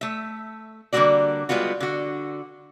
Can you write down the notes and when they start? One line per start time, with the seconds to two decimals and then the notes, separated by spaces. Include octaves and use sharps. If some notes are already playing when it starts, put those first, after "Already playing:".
0.01 A3 E5
0.93 D3 G3 A#3 C4 F#4 D5
1.49 G3 G#3 B3 F4 F#4
1.80 D3 F#4